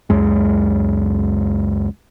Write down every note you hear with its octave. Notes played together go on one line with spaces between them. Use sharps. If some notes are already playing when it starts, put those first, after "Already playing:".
C#2 F#2 G#3